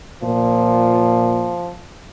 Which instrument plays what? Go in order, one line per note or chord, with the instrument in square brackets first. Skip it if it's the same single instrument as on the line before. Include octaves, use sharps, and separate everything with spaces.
[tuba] A#2 [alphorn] F3